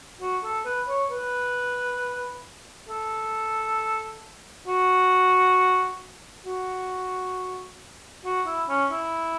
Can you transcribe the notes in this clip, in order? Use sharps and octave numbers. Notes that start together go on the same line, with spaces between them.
F#4
A4
B4
C#5
B4
A4
F#4
F#4
F#4
E4
C#4
E4